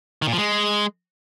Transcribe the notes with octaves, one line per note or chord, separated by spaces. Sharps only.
D#3
A#2
F3
G#3